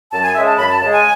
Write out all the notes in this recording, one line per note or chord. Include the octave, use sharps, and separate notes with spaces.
F#2 A5
G#5
C#3 G#3 E5
A5
F#2 B5
A5
C#3 G#3 A5
G#5